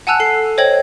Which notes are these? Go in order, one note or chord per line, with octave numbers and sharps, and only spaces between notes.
F#5 G#5 A5 E6 F#6 F7
A4 C7
C5 C#5 D#5 G5 G#6 F#7